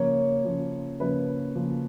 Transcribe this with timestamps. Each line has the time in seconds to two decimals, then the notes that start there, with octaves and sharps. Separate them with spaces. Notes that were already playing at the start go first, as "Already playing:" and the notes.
Already playing: C#3 F3 A#3 C#4 C#5
0.44 C#3 F3 A#3 C#4
1.00 C#3 F3 A#3 C#4 B4
1.55 C#3 F3 A#3 C#4